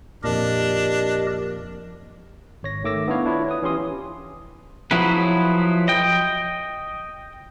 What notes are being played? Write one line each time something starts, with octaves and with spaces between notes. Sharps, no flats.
F2 A#2 D4 G4 A#4 D#5
G#1 C#5 A#6
D#3 A3 D6 E6 A#6
B3 D4 E4 C#5 F5
D4 E4 F4 C#5
B4 D#6
E3 C#4 G4 C6 D#6
F3 F#3 E4 G#4 B4
D#5 G5